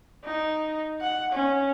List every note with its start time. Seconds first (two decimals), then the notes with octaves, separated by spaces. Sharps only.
0.24 D#4
1.01 F#5
1.33 C#4